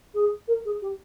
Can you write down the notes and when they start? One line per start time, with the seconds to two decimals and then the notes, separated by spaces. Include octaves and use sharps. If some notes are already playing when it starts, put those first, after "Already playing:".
0.14 G#4
0.47 A#4
0.65 G#4
0.81 G4